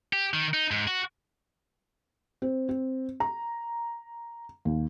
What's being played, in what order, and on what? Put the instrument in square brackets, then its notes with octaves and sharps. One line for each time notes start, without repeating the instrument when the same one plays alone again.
[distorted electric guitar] G4
D#3
D#4
G#2
F#4
[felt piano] C4
C4
A#5
D#2